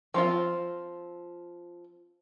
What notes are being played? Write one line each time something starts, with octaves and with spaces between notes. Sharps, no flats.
F3 C4 F4